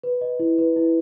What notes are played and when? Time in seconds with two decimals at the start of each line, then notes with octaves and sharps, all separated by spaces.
0.03 B4
0.21 D#5
0.39 E4
0.58 B4
0.76 E4